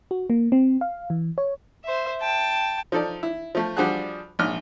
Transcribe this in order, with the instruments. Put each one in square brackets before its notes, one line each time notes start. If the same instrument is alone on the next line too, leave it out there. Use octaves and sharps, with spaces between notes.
[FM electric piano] F#4
A#3
C4
F5
E3
C#5
[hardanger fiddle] C5 E5
G5 A5
[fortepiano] F3 D#4 A4 D5
E4
F3 A3
F3 G3 D4 F#4 G#4 F#6
A#1 G#2 F6